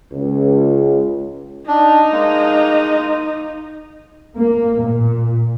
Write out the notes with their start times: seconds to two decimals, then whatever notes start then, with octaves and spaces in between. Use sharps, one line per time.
0.12 C#2
1.68 D4 D#4
2.12 G#3 A#3
4.38 A#3
4.80 A#2